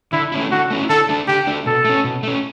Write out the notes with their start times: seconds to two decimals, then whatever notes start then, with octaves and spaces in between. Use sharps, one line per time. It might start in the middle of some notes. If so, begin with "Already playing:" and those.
0.13 D3 E4
0.32 A3 C#4 E4
0.51 D3 F#4
0.70 A3 C#4 E4
0.89 D3 A4
1.09 A3 D4
1.28 D3 G4
1.47 A3 D4
1.66 B2 A4
1.85 A3 C#4
2.04 B2
2.23 A3 C#4